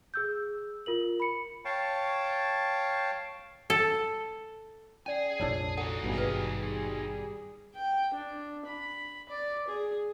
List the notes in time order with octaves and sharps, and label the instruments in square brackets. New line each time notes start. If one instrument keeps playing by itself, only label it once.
[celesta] G#4 E6 G6
F4 A#4 F#7
B5 C#7
[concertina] C#5 F5 G5 A5
[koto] A4
[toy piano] C#4 D5 [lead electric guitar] G#4 G#5
[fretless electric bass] F1 A#1 D4 [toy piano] C#5 A5 E6
[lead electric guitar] D#4 F#4 [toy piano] A4 F#5
[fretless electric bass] G#1 G2 B2 [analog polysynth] G3 G#4
[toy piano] B4
[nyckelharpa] G5
D4
B5
D5
G#4